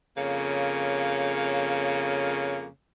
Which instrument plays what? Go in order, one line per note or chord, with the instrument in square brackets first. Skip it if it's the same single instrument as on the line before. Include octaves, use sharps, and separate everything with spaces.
[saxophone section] F2 C#3 A#3 C#5 F5